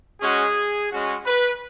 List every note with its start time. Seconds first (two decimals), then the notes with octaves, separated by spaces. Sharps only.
0.20 G#3 C#4 F#4 G#4
0.90 G#3 C#4 F#4
1.25 B4